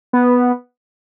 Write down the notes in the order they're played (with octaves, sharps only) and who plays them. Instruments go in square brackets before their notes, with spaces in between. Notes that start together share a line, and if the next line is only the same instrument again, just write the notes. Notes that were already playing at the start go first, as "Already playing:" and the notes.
[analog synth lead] B3